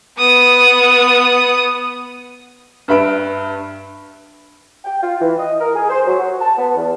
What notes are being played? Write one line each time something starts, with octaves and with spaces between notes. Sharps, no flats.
B3 D#6
G2 B4 E5 B5 D7
G5
F4
E3
D#5
A#4
G#4
C5
F#3
F#4
A5
B3
E2